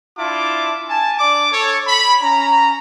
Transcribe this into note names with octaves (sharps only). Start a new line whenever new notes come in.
D4 E4 F4 A5 D6
G#5 A5
D4 D5 D6
A4 C#5
B5
C#4 A#5